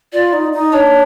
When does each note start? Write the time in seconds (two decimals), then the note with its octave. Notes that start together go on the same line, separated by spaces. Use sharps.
0.13 F4 D5
0.33 D#4
0.53 D#4
0.73 D4 C#5